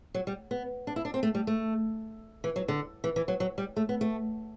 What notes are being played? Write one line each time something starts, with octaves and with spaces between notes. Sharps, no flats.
F#3
G3
B3
D4
E4
D4
C4
A3
G3
A3
E3
F#3
D3
E3
E3
F#3
F#3
G3
A3
B3
A3